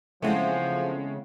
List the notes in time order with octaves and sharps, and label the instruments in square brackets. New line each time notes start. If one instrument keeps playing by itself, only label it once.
[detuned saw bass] C#3 [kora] E3 B3 C4 [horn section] F3 [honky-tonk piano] G#3 A3